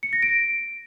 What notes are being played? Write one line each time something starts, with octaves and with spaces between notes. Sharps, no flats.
C#7
A#6
D7